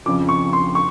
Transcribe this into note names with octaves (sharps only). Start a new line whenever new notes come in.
F2 C#3 F3 D6
C#6
C6
C#6